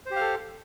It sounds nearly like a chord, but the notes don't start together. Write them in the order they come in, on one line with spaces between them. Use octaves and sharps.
C5 G4 F5 A4